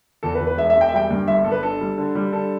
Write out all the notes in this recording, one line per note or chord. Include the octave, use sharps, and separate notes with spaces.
E2 A4
B4
E2
B4
E1 E5
E5
E1
G5
E5
G3 G5
G2
G1 E5
G1 A4
B4
D4 A4
G3
D3
G3
D3 A4